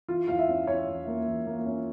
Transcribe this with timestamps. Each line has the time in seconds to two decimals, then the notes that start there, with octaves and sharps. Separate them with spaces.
0.08 E3 F4
0.28 E2 F5
0.39 E5
0.49 C#4
0.67 C#4 C#5
0.88 E2
1.07 A#3
1.28 E2
1.47 A#3
1.66 C#4